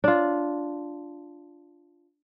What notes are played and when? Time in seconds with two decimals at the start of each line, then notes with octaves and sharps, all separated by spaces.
0.04 D4 F4